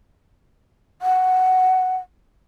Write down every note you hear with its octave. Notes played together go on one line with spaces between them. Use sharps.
F#5